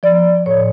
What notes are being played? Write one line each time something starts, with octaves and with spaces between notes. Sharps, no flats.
F3 D5
A2 C#5